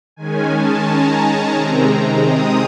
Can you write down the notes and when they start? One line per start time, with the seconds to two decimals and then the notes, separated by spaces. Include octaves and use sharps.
0.16 D#3 G#3 C#4 G#5
0.51 A5
0.86 A#5
1.55 C3 D#3 G#3 C4
2.26 D#6